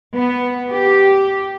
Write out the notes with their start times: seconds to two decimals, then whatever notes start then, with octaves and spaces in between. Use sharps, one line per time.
0.17 B3
0.71 G4